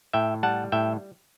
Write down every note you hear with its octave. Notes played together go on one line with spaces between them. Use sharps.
A2 E5 G5
G3 F#5 A5
A2 E5 G5